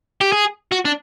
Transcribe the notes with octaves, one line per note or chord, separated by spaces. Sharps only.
G4
G#4
F#4
D4